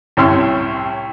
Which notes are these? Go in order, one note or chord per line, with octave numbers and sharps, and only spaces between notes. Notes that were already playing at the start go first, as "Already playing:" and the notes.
C2 A2 C#4 C#5 C6 E6